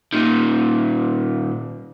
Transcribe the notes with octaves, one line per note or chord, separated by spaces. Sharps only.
A#2 D#3